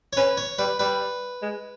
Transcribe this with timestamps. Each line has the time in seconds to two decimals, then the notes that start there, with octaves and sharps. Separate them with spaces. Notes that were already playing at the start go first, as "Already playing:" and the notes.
0.13 C#5
0.17 C#4 B4
0.37 C#5
0.59 G3 B4
0.79 G3 B4
1.42 G#3